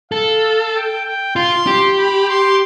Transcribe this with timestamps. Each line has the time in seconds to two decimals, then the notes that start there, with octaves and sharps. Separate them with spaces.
0.12 A4 F5
0.75 G5
1.04 G5
1.36 F4 C6
1.67 G4
1.97 B5
2.29 C6